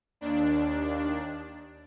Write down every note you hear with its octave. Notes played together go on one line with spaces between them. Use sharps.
D#2 D4